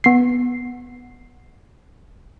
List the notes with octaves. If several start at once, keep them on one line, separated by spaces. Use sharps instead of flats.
B3 C7